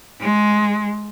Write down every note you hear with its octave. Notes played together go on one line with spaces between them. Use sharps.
G#3